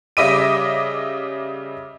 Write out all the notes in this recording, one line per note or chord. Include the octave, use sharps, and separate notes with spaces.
C#3 G3 D#5 E5 D6 D#7